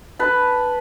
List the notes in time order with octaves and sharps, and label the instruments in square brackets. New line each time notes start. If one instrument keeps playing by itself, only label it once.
[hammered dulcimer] B4 A5